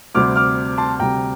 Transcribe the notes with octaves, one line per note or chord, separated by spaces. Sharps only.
D2 C3 G3 C4 D6 F6
D6 F6
A5 C6
D2 C3 G3 C4 G5 A#5